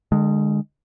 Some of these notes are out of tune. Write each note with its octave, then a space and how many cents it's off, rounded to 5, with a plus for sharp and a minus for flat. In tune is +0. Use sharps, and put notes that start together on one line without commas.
D3 +35 G#3 -5